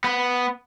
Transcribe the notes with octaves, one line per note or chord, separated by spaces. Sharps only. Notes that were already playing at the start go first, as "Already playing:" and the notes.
B3